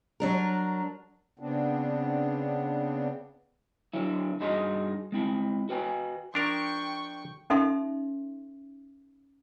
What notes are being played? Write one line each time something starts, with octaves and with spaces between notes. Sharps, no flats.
F#3 D4 A#4
C#3 B3 C4 D4
D3 F#3 E4
G2 D#4 F#4 G#4 D#5 C6
G#3 C4 E4
F#4 B4 G5 G#5
F3 D4 A#4 G5 C#6
C#4 D#4 A4 E5 C6